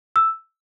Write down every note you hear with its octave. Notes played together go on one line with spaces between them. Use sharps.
E6